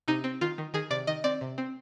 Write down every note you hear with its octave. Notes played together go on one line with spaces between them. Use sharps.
C3 D#4
C4
D#3 F4
D#3
D#3 G#4
C3 D5
D#3 D#5
C4 D5
C3
C4